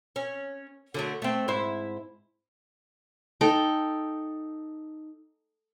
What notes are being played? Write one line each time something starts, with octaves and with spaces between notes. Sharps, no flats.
C#4
D3 F#3 A3
A3 C4
G#2 E4 C5
D#4 A4 G5